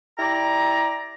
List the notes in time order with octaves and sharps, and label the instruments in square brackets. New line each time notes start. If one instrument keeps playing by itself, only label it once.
[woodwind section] E4 G4 D5 A#5